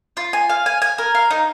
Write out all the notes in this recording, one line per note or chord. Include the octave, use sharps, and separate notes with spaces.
F4
G#5
F5
G#5
G#5
A#4
F5
D#4